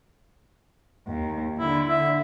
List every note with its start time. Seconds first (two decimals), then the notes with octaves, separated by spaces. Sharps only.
1.08 D#2
1.59 D3 E4
1.89 E5